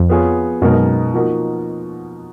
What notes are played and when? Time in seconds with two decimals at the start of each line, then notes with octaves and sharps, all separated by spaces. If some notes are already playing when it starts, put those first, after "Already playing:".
Already playing: F2
0.09 B3 F4 G#4 C#5
0.62 F#2 B2 G#3 B3 D#4 A#4
1.14 F3 A#3 D#4 F#4 A#4